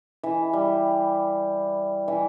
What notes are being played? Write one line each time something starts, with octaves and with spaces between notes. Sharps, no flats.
E3
G3
E3